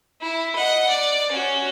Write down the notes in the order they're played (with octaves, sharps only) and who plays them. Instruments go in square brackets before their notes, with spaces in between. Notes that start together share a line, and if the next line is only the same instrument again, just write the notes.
[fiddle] E4
D#5 F#5
D5
C#4 F#4